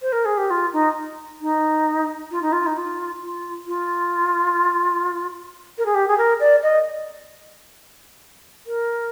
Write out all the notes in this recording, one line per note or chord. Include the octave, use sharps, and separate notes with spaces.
C5
A#4
G#4
G4
F4
D#4
D#4
F4
D#4
F4
D#4
F4
F4
F4
A#4
G#4
G4
G#4
A#4
D5
D#5
A#4